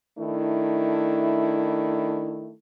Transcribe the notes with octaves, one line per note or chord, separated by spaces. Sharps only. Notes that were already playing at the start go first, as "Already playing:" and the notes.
D#3 A3 D4 E4